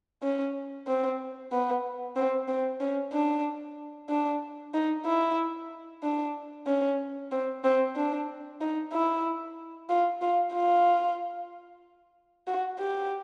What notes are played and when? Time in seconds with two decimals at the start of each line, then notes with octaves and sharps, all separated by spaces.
0.23 C#4
0.87 C4
1.52 B3
2.16 C4
2.48 C4
2.80 C#4
3.13 D4
4.09 D4
4.74 D#4
5.06 E4
6.03 D4
6.67 C#4
7.32 C4
7.64 C4
7.96 D4
8.61 D#4
8.93 E4
9.89 F4
10.22 F4
10.53 F4
12.47 F#4
12.79 G4